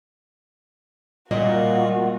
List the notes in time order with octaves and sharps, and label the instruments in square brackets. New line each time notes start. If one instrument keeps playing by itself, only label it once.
[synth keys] A#2 [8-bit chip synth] G3 [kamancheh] F4 F#4 [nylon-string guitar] D#5